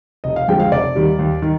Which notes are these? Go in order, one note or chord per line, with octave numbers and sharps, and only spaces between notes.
F1 D#5
F5
F2 D3 F3 G#3 G5
F5
F1 D5
D#2 D#3 G3
D#2
D#3